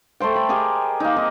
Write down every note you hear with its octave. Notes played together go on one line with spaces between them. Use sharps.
A3 A4 C5 G5
B5
G4 G#4 A#4 D#5
A#3 D#4
C4 D#4 D#5